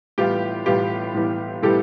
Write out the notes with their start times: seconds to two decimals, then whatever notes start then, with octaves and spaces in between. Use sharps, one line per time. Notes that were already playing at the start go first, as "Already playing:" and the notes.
0.18 A2 E3 G3 B3 F4 G4
0.66 A2 E3 G3 B3 F4 G4
1.14 A2 E3 G3 B3
1.62 A2 E3 G3 B3 G4 A4